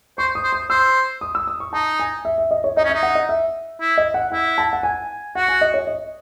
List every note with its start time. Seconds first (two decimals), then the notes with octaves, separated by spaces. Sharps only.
0.18 C5 C#6
0.35 D#6
0.44 C5
0.53 D#6
0.70 C5 E6
1.21 D#6
1.35 E6
1.47 D#6
1.60 C#6
1.73 D#4 A5
2.00 G#5
2.25 E5
2.38 E5
2.51 D#5
2.64 C#5
2.77 D#4 D#5
2.85 C#4
2.89 D#4 E5
3.03 F#5
3.15 D#5
3.29 E5
3.81 E4
3.98 D#5
4.14 F#5
4.32 E4 F#5
4.58 A5
4.73 F#5
4.83 G#5
5.35 F#4 F#5
5.48 G#5
5.61 D#5
5.74 C#5
5.87 D#5